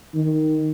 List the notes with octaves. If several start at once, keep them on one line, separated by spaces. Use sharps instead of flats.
D#3